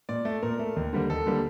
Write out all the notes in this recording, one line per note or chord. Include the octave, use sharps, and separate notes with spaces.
A#2 D5
A3
A#2 A#4
A3
D#2
D3 G3 A#3
D#2 A4
D3 G3 A#3